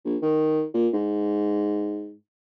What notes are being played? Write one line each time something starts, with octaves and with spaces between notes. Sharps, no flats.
A#1
D#3
A#2
G#2